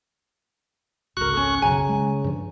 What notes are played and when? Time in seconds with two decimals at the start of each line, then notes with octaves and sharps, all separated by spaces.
1.17 G#1 C#2 F#4 A#4 C#6 F#6
1.33 C#4 A4
1.62 B1 F#2 C#3 G#5 A#5
1.89 G#3
2.24 G2 F3